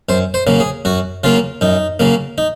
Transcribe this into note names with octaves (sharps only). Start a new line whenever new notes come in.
F#2 C5
C5
C#3 F#3 A#3
G#4
F#2 F#4
C#3 F#3 A#3 F4
F#2 D#4
C#3 F#3 A#3
D#4